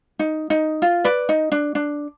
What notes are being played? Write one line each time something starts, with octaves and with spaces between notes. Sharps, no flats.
D#4
D#4
F4
B4 D5
D#4
D4
D4